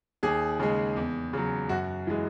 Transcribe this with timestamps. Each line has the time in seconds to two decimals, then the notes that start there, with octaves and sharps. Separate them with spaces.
0.23 D#2 G#4
0.60 C#3 G#3
0.96 E2
1.33 C#3 F#3
1.69 F#2 F#4
2.07 E3 G#3